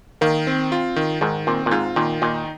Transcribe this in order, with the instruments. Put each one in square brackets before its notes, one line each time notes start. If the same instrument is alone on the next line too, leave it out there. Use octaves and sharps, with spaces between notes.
[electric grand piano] D#3 [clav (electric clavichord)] A#3
[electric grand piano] C4
F4
D#3
[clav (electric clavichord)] G#2 [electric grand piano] D#3
[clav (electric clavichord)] A#2 [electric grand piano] C4
[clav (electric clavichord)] A#2
[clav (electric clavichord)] G#2 [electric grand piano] F4
[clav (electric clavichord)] A#2 [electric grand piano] D#3
[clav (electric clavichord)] A#2 [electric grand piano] D#4